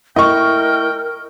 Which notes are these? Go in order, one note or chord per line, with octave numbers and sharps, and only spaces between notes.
A3 E4 A#4 D#5 G5 C#6